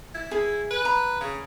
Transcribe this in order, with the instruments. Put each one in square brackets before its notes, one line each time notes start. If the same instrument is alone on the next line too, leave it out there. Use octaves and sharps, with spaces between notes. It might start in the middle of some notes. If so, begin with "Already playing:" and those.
[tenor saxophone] E4
[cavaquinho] G#4
[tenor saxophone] B4
[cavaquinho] A#5 B5
[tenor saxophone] C#3